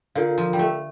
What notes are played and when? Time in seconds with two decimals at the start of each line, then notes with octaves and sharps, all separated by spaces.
0.15 D3 F4 A#4 F5
0.38 F3
0.53 G3
0.59 A3